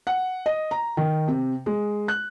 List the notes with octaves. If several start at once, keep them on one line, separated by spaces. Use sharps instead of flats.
F#5
D#5
A#5
D#3
C3
G#3
F#6